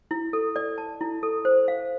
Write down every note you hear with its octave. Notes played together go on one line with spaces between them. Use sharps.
E4
A4
D5
A5
E4
A4
C5
F5